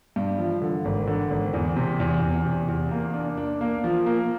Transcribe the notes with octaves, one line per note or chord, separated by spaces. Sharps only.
G2
F3
D3
G#1
D3
G#1
E2
C3
E2
E2
C3
E2
A#3
D4
D4
A#3
F3
A#3